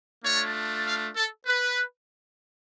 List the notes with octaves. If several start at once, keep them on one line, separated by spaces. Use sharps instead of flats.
A3 D4 F4 C#5
F5
A4
B4